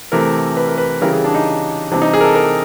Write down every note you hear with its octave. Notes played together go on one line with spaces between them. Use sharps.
C3 E3 A3 A#4
B4
A#4
B4
C#3 E3 G3 A#4
G#4
D4
D#4
C3 E3 G3 D4
D#4
G#4
A#4
A4
A#4